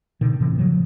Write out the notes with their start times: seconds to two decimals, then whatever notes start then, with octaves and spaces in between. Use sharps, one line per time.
0.21 B2 D3 D#3
0.40 A2 C3 E3
0.58 C#3 F3 F#3 A3